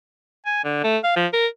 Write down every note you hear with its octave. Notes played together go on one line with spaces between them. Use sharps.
G#5
D3
A3
F5
F3
A#4